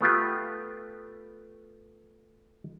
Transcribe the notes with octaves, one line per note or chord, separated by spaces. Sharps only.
A3 B3 F4 G4